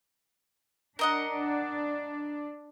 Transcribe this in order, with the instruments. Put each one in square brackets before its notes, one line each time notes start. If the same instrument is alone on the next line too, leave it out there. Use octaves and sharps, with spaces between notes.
[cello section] D4 [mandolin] A#4 D#5 F#5